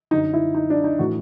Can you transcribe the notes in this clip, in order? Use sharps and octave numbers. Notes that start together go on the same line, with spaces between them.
F#2 D3 F#3 D#4
E4
D#4
D4
D#4
A2 E3 F#4